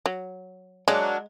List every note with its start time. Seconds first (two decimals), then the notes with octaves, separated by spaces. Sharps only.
0.06 F#3
0.88 F#3 G#3 A#3 D4